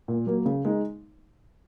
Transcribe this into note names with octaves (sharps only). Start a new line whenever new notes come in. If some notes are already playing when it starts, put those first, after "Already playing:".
A#2
F#3 A#3
C#3
G#3 D#4